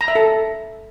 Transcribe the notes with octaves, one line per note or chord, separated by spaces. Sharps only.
A#5
E5
A4